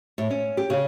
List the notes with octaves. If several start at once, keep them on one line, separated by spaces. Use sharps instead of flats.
A2
C#4
G4
C#3